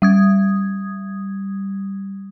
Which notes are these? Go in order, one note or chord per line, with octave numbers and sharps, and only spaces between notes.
G3 D#6 G#6